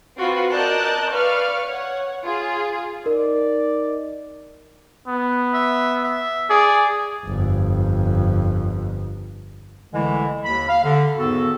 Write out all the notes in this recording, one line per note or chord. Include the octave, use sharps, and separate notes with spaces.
C4 F4 F#4 B4
A#4 D5 D#5 A5 F#6 G6
B4 D5 F5 C#6 F6
C#5 F#5
F4 G#4
D#4 A#4 D5
B3
E5
E5
G#4 D5
G1 F2
C2 D3 E3 G#3 A3 E4
D#2 B5
F5
D3
E2 G#2 D#3 B3 F#4 A4